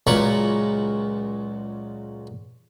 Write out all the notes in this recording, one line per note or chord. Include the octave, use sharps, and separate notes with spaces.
C#2 A#2 F#3 A#4 B5 C#6